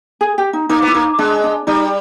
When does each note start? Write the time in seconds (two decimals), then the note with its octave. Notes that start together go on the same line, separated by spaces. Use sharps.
0.21 G#4
0.38 G4
0.53 D#4
0.69 A#3 D#4
0.82 B3
0.88 E4
0.94 A#3 D#4
1.19 G#3 D4
1.44 D4
1.67 G3 D#4